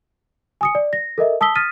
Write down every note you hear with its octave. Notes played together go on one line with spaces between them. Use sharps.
G#5 D#6 C#7
D5
A#6
A4 A#4 D#5 E5
A5 D#6 E6 B6 G7
D#6 F6 A6 B6 D#7